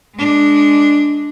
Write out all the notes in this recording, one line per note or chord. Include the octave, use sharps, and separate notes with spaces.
G#3 D4